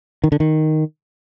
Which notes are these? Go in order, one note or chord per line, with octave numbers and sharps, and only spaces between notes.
D#3
D3
D#3